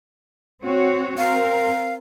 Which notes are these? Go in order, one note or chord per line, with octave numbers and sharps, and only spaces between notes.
C4 F#4 C#5
C4 A#4 F5